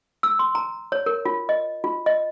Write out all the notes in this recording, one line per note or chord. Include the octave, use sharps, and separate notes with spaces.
E6
C6
A#5
C#5
A#4
F4
D#5
F4
D#5